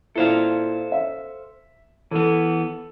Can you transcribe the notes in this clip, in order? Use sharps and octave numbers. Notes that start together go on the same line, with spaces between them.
A#2 E4 A4 C5 F5
E5
E3 B3 A4